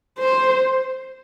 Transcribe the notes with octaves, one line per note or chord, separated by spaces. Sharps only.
C5